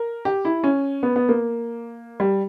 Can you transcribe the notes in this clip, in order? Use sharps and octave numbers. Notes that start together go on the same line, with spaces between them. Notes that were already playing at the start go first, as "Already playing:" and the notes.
Already playing: A#4
G4
E4
C#4
B3
B3
A#3
G3